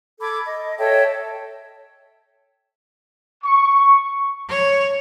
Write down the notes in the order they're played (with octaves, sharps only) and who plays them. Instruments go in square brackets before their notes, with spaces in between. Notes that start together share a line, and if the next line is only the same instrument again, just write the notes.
[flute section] A4 B5 D6 G#6
D#5
A4 C#5 E5 G5
[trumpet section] C#6
[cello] C#5